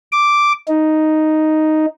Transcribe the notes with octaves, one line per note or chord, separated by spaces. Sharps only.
D6
D#4